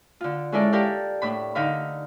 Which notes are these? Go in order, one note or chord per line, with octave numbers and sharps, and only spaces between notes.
D3 F4
G#3 C#4 E4 A4 A#4 D5
G4 A4 A#4 D5 F5
A2 D4 B5
D3 D#4 A#4 F5 B5